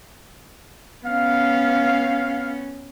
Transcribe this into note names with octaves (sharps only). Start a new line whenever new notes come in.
B3 C#4 F5